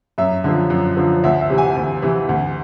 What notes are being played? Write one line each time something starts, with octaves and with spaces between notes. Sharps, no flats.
F#2 E5
D3 F3
F#2
D3 F3
D2 E5
E5
C3 E3
G#5
D2
C3 E3
D2